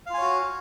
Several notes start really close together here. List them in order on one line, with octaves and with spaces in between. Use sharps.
F5 F4 G#5 C#5 F#4